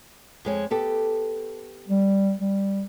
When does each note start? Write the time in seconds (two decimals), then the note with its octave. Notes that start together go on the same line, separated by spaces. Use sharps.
0.45 F2 G#3 C#5
0.70 B3 G4 A4
1.88 G3
2.39 G3